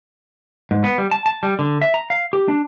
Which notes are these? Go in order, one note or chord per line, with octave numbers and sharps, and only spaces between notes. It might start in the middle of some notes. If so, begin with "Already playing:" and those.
G#2
B3
G3
A5
A5
G3
D3
E5
A#5
F5
G4
D4